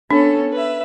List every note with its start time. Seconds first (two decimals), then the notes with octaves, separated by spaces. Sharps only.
0.11 B3 C#4 D4 A4
0.52 B4 E5